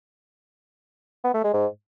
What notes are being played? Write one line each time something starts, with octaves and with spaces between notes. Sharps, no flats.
B3
A3
G#3
G#2